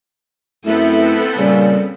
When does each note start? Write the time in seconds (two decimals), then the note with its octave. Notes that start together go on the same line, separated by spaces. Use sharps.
0.65 F#2 A3 B3 C4 E4 A4
1.38 A#2 C#3 G3